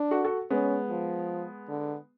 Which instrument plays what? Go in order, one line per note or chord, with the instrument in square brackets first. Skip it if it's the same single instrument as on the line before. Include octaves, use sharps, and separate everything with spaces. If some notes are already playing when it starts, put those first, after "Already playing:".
Already playing: [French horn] D4
[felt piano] F#4 A4
F#4 A4
[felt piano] G#3 B3 [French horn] C#4
[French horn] F3
D3